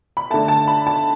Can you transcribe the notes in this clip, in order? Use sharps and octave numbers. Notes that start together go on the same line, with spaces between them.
B5
D3 A3 A5
A5
B5
A5